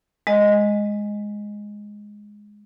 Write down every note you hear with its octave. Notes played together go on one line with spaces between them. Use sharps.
G#3 D#5